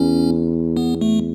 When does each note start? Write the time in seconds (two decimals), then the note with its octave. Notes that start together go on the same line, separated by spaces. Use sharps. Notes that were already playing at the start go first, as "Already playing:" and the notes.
Already playing: E2 C#4
0.77 B3
1.01 A3